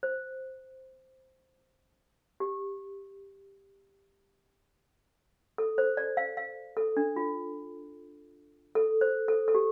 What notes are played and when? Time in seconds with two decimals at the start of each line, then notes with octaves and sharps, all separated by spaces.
0.03 C5
2.40 G4
5.58 A4
5.78 C5
5.97 D5
6.17 F5
6.37 F5
6.77 A4
6.97 D4
7.16 F4
8.75 A4
9.01 C5
9.28 A4
9.48 A4
9.55 G4